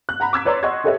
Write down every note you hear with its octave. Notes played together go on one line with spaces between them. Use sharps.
F#6
F#5 A#5 B5
D6 E6 G#6 B6
B4 C#5 D5 A#5 C6
D#5 F#5 C6 C#6 F#6 G#6
G4 A4 B4 C#5 D#5 E5